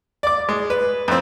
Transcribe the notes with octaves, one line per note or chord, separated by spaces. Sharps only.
D5 D6
G#3
B4
F2 C4